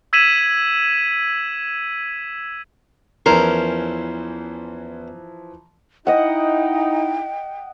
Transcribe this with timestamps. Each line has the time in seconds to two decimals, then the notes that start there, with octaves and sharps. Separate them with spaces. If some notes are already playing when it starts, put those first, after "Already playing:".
0.13 E6 G#6 B6 D#7 E7 F#7
3.26 E2 E3 F3 C#4 A#4 C5
6.07 D#4 E4 D#5 F#5 G5